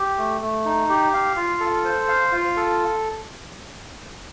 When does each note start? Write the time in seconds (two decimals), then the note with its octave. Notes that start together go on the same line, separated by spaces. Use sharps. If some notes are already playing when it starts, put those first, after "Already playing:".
Already playing: G4
0.18 A3
0.41 A3
0.65 D#4
0.89 G4
1.13 F5
1.36 F4
1.60 A4
1.84 C5
2.08 F5
2.32 F4
2.57 A4